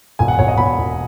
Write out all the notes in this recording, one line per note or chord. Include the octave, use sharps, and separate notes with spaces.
E1 G#5
F#5
E1 C#5
D#5
E1 B5
E1